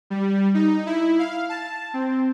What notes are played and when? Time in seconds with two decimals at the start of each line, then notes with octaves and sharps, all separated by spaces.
0.10 G3
0.54 D#4
0.86 E4
1.19 F5
1.49 A5
1.94 C4